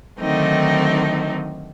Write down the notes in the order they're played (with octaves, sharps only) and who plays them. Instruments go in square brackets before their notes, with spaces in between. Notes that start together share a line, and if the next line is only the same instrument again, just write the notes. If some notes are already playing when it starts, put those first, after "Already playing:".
[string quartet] D3 D#3 F#3 A3 C4 D#4